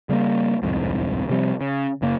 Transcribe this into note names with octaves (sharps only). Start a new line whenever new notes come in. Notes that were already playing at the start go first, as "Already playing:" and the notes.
C#3 G3 G#3 A#3
D1 C2 F2 G#2
C3 F3 G3 C4
C#3
F#1 C#3 A#3